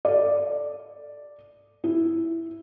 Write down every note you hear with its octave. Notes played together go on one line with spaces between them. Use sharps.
A4 D5
E4